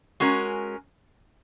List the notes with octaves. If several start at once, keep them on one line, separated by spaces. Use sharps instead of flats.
G#3 C#4 F#4 A#4